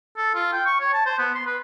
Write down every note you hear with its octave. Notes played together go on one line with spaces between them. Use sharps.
A4
F4
G5
C#6
C#5
A5
C5
B3
C6
B4